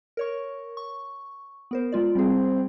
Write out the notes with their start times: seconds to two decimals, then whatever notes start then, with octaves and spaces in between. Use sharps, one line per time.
0.17 A#4 C#5 C#6
0.77 C#6
1.71 B3 A#4 C5
1.92 G#3 F4 D5
2.15 G3 C4 G#4